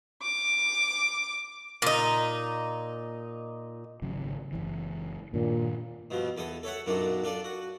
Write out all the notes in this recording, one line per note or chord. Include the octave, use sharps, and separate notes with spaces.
D6
A#2 D#4
G#1 C#3 F#3
F#1 C2 E3
G2 A#2 D#3 D4
G2 B2 F3
E2 A4 D#6
A4 C#5 E5 F#5
B1 F#2 A#2 D4 A4 A#5
D4 F4 A4 D5
F#4